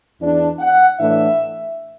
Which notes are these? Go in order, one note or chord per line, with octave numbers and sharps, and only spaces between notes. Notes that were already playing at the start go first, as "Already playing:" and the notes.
E2 E3 D4
F#5
A2 E3 A3 D4 E5